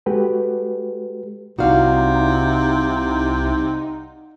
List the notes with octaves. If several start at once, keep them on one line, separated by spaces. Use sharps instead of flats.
G#3 F#4 G4 A4 B4
C2 C3 D#4 E4 F#4 D5 F5